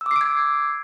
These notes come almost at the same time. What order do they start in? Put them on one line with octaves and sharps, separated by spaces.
E6 D6 C7 D7 G#6